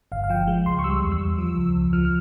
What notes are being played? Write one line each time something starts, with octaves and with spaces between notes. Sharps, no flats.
G1 F5
F5
F3 G5
G#3
C#2 C6
C#6
G3 E6
E2
E6
E2
F3
C#2
C#2
F3 F6
F6